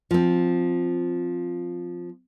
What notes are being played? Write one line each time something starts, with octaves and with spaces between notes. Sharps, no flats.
F3 C4